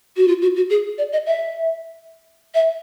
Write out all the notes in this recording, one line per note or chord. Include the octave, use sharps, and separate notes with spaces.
F#4
F4
F#4
F#4
G#4
D5
D#5
E5
E5